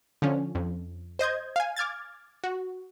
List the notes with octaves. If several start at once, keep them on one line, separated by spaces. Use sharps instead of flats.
D3 F3 C#4
F2
C5 D#5 G6 G#6
F5 G#5
D6 F6 G#6 A6
F#4